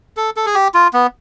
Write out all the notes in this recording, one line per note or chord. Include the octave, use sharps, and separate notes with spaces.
A4
A4
G#4
G4
F4
B3